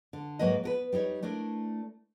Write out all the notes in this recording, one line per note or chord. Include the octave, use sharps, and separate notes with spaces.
D3
G#2 F#3 A#3 B4 D#5
B3 A#4 B4
G3 D#4 G4 C#5
A3 D4 E4 A#4